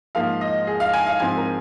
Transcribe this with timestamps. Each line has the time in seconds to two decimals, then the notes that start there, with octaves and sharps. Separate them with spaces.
0.15 G#2 F3 A#3 F5
0.41 D#5
0.67 G#4
0.80 F5
0.93 G#5
1.07 F5
1.20 G#2 F3 G#3 C4 G#5
1.37 A#4